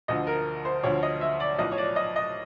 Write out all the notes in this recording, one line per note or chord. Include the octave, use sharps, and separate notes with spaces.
D2 D3 F3 D#5
A#4
C5
D2 D3 F3 C#5
D#5
E5
D5
B1 A2 F3 D#5
C#5
D5
D#5
D#5